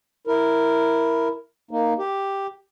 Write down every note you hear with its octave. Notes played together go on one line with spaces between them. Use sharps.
E4 A#4
A#3 D#4
G4